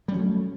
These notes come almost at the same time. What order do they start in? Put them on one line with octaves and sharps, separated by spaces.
G3 C#4 F#3 A3